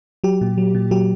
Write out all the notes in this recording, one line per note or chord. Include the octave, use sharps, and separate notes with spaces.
F#3 G4
A#2
F#3
A#2
F#3 G4